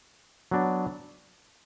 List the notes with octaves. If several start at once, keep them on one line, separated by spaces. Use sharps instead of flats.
F#3 B3 D4